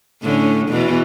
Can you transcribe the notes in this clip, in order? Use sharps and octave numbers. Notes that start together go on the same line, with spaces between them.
A2 D3 C#4
E2 B2 E3